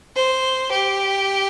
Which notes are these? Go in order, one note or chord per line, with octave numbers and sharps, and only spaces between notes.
C5
G4